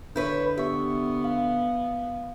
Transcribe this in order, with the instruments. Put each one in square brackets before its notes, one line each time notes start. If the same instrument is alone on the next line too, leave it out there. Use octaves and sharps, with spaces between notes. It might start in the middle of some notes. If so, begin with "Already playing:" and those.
[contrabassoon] D3 [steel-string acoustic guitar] E4 B4 C#5 [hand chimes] G6 B6
[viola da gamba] B3 [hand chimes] G4 C#6 [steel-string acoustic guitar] E5
[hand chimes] F5